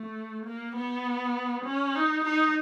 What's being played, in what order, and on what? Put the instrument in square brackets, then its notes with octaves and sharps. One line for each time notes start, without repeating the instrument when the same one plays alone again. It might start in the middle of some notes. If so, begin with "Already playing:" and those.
Already playing: [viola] A3
A#3
B3
C#4
D#4
D#4